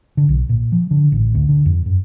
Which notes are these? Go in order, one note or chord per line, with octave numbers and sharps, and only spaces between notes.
D3
B1
A#2
F3
D3
A1
D2
D3
F2
F#2